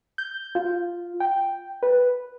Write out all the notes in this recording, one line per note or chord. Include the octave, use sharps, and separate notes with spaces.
G6
F4
G5
B4